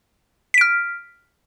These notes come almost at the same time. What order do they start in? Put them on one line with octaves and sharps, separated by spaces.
B6 D7 F6